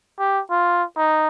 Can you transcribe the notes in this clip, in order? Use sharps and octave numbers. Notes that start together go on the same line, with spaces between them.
G4
F4
D#4